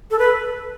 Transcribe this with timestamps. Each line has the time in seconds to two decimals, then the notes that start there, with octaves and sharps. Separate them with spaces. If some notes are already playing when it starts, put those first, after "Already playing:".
0.11 A4
0.19 B4